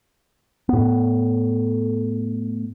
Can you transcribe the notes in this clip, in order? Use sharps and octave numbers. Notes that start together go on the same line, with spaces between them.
A2 B3